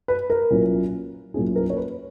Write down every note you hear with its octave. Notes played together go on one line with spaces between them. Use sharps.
B4
A#4
B1 A#2 A#3 C#4 E4
B1 A#2 A#3 C#4 E4 G#4
A#4
C#5
B4